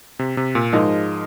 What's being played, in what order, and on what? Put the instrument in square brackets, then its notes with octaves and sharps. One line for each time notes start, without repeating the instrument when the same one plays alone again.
[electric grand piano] C3
C3
A#2
[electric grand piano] G#2 [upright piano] F3 G#3 D#4 A#4 D#5